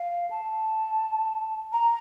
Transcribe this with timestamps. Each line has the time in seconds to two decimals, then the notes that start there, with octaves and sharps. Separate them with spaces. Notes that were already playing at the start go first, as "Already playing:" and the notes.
Already playing: F5
0.31 A5
1.73 A#5